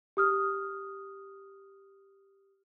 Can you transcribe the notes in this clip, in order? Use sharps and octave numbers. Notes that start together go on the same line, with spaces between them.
G4 D#6 F6